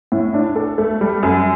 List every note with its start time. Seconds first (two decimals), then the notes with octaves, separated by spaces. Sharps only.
0.12 A2
0.34 D4
0.56 A4
0.78 A3
1.01 G3
1.23 F#2